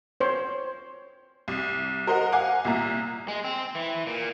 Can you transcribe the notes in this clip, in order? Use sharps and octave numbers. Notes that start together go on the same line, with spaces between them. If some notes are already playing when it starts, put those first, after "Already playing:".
C5 C#5
C2
A#4 C5 D#5 F#5
F5 F#5 G#5 D6
C2 A#2 E5 A#5
G#3
C4
E3
A#2